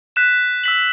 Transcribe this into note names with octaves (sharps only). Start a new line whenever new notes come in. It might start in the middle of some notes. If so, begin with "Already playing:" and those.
F#6 B6 E7
E6 B6 F#7